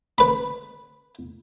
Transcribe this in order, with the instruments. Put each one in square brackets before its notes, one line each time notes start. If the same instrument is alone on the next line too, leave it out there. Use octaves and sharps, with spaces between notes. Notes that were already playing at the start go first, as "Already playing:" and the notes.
[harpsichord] B4 B5